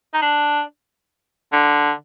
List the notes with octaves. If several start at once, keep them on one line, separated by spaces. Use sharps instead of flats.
D#4
D4
D3